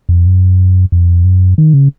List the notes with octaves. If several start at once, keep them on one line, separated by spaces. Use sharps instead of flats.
F2
F#2
F2
F#2
D#3
C#3